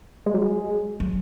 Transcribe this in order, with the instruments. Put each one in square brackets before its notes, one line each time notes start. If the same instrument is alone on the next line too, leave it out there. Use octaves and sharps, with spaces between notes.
[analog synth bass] G#3
F#3
G#3
[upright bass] F#3